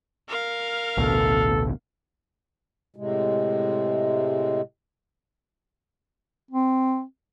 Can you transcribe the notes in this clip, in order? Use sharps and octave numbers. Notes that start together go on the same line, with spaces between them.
A#4 F5
A1 D2 B2 A4
A2 C3 G#3
C4